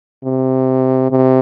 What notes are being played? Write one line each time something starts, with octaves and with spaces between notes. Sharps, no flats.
C3
C3